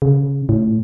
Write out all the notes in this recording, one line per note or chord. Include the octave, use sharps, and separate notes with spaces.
C#3
A2